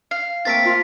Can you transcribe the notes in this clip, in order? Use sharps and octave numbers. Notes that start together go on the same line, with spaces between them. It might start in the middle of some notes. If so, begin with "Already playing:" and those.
F5
A3 A#3 C4 A6 B6 D7
F4